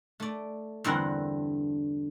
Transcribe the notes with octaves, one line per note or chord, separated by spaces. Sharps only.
A3 D5
E2 G2 D3 C4 A#4 F#5